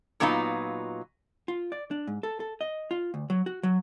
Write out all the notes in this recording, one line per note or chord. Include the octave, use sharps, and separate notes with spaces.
A#2 F#3 B3 D#4 F4
F4
D5
D4
G#2
A4
A4
D#5
F4
D2
F#3
F#4
F#3